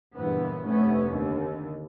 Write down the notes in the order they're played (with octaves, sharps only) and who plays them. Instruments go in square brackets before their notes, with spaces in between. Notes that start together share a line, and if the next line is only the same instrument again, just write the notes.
[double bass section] F#1 G2 A#2 E3 B3
F1 A3 B3 C#4
D#2 D3